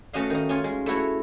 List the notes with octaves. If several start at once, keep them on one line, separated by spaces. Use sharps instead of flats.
A3 C#4 F#4 D#5 F5
D#3 D#4
C#4 F4 G#5
G#3
A3 E4 F#4 C#5